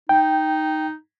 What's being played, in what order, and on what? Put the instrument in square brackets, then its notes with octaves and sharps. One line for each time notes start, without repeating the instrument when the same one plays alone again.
[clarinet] D#4 [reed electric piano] G5